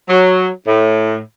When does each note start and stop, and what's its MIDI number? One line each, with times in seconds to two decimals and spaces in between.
0.09 0.47 54
0.67 1.19 45